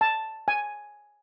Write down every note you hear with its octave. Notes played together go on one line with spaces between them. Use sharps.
A5
G#5